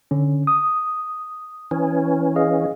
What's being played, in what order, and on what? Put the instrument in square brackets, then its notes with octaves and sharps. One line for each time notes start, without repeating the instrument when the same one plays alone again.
[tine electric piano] D3 C#4
D#6
[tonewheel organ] E3 C#4
[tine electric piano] G#4 D#5 F5